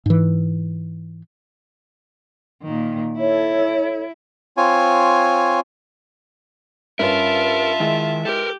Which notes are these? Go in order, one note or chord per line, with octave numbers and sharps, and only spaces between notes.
G#2 E3
A#2 D#3
E4 A4 C#5
C4 F4 C#5 G#5
G2 C#4 F4 A#4 E5 A5
D#3 G#3 E4
G4 A4 A#4